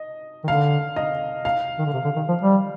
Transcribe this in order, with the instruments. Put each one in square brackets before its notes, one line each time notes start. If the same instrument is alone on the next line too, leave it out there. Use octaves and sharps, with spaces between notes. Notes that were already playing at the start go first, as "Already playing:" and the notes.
Already playing: [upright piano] D#5
[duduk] D#3
[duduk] D3 [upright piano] F5
[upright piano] D#5
F5
[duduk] D#3
D3
C3
D3
D#3
F3
G3